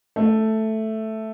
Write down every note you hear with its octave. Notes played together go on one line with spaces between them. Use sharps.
A3